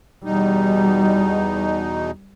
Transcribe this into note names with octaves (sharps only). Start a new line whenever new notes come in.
E2 B2 G3 D#4